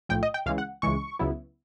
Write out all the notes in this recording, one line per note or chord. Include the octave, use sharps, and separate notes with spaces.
B1 A2 F3 G5
D#5
G5
C#2 C#3 E3 G#3 F5
F#5
C#2 C#3 E3 G#3 C#6
C#2 C#3 F#3 B3 E4